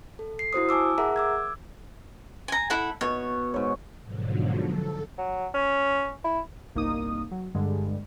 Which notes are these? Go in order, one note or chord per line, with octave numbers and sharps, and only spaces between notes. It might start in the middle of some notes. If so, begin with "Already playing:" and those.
A4
C7
E4 F#4 C5 D#6
G#5 A5 D6 E6
G#4 A#4 E5 F#5 A#5
D6 E6 G#6
G#5 A#5
E4 A4 F#5
B2 C#5 C#6
G#2 C#5
G#2 B2 D3 F3 F#3
A4
F#3
C#4
E4
G1 C2 A#3 D#4 D#6
F#3
G2 D3 G#3